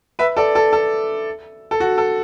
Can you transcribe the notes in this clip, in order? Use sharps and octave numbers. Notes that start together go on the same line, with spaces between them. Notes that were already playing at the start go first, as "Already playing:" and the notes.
B4 E5
A4 D5
A4
A4
A4
F#4
A4